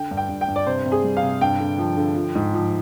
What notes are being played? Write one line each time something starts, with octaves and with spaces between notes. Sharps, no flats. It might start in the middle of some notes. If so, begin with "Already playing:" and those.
Already playing: D3 G5
G2
G5
G2
G5
G2
D5
C3 C5
C3
G#4
G3
F5
C3
G2 G5
D3
F3
D3
F3
G#2
F3